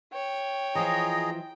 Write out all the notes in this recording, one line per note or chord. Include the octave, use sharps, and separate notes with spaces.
C#5 G5
E3 F3 F4 G#4 D#5 A#5